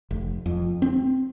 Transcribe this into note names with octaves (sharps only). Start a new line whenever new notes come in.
F1
F2
C4